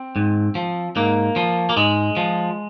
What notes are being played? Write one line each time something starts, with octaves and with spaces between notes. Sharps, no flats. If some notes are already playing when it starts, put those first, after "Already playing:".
Already playing: C4
G#2
F3
G#2 A#3
F3
A#3
G#2 G#3
F3